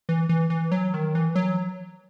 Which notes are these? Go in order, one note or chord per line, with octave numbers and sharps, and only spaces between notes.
E3
E3
E3
F#3
D#3
E3
F#3